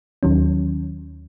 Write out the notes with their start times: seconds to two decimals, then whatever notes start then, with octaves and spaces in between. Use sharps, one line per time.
0.23 D#2 D#3 F#3 C#4